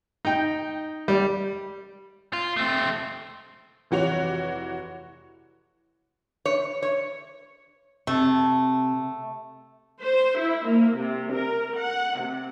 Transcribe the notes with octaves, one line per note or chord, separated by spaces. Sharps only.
D#4 G5
G3
F4
A3 C4
F1 E3 F#4 C#5 F7
C#5
C#5
C3 A3
C5
E4
A#3
C3
A#4
F#5
C3